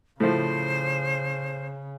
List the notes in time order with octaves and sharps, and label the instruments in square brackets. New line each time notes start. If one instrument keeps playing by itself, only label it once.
[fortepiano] A2 F3 [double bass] C#3 [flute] C5